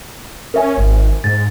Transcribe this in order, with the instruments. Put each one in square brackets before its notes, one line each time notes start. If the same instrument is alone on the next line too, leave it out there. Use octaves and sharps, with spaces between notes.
[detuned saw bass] C#4 [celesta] A#4 E5 G#5
[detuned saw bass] G#1
[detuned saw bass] G#2 [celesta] A6